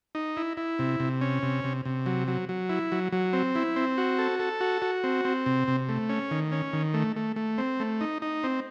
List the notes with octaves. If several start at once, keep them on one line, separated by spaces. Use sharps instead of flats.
D#4
E4
E4
C3
C3
C#4
C3
C3
C3
F#3
F#3
F#3
E4
F#3
F#3
C4
E4
C4
F#4
A4
A4
F#4
F#4
C4
C4
C3
C3
A3
C#4
D#3
C#4
D#3
A3
A3
A3
C4
A3
D#4
D#4
C4